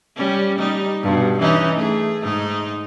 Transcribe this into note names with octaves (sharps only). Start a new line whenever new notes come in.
G3 C#4
G3 D#4
G2 B2
E3 C#4 D#4
A3 G#4
G#2 D#4